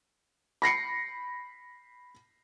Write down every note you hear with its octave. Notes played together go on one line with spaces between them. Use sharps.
B5 A#6 C7 C#7